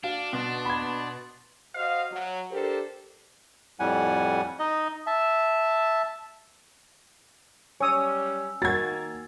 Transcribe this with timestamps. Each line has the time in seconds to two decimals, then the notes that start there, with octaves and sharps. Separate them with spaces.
0.03 D4 F#4 F5
0.33 B2 C6
0.65 B5 G#6
1.75 F#4 C5 D#5 F5
2.11 F#3
2.51 D4 G4 A4 A#4 C5
3.80 F2 A2 G3 F#5 G#5
4.59 D#4 D#5
5.07 E5 A5
7.81 F#3 G3 C#4 C#5 G#5 D#6 E6
8.62 D#3 A#3 F#4 G#6 A6